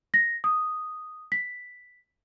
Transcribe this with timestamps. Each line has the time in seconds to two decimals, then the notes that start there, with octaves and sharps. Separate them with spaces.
0.14 A#6
0.44 D#6
1.32 B6